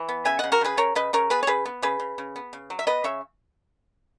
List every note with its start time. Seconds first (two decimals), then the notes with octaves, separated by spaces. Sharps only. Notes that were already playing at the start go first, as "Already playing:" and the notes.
Already playing: E3
0.09 B3
0.25 C#3 E5 G#5
0.39 C#3 D#5 F#5
0.52 F#4 A#4
0.61 C#3 G#4 B4
0.77 C#3 A#4 C#5
0.95 C#3 B4 D#5
1.13 C#3 A#4 C#5
1.30 B3 G#4 B4
1.43 C#5
1.47 C#3 G#4 B4
1.65 B3
1.82 C#3 G#4 B4
2.00 C#3
2.18 C#3
2.36 B3
2.53 C#3
2.70 F#3
2.79 E5
2.87 B3 B4 D#5
3.04 C#3 C#5 E5